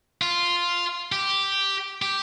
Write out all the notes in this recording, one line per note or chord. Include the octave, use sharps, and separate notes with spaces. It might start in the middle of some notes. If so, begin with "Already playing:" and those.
F4
G4
G4